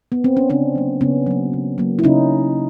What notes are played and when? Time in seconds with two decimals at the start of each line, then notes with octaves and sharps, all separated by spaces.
0.12 B3
0.24 C4
0.37 C#4
0.50 C#3 C4 D4
0.75 F#3 A#3
1.01 C#3 B3 C#4
1.26 F#3 A#3
1.53 C#3
1.78 F#3 A#3
1.99 E4
2.04 C#3 C#4 D#4